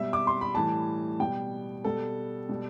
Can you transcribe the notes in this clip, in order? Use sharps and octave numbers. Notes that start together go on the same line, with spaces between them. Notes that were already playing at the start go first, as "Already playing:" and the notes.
Already playing: B2 G3 E5
D6
C6
B5
A2 E3 G3 A5
B2 G3 G5
B2 G3 A4
B2 G3